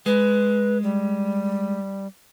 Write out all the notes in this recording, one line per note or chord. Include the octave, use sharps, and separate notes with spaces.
G#3 B4
G3